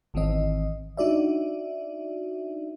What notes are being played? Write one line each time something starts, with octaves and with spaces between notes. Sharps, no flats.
G#1 D#3 E3 C4 D#5
D4 D#4 F#4 D5 E5